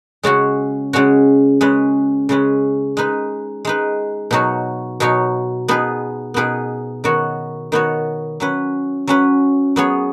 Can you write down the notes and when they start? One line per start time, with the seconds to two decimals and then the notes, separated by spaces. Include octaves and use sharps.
0.23 C#3 G#3 C#4 F#4 C#5
0.93 C#3 G#3 C#4 F#4 C#5
1.61 C#3 G#3 C#4 B4
2.29 C#3 G#3 C#4 B4
2.97 G#3 D#4 B4
3.65 G#3 D#4 B4
4.31 B2 F#3 D#4 F#4 C#5
5.00 B2 F#3 D#4 F#4 C#5
5.68 B2 B3 D#4 G#4 B4
6.34 B2 B3 D#4 G#4 B4
7.04 D#3 B3 F#4 C#5
7.72 D#3 B3 F#4 C#5
8.40 F#3 C#4 B4
9.07 F#3 C#4 B4
9.76 F#3 B3 G#4 C#5